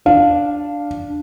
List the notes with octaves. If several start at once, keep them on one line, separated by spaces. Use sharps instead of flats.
D4 F5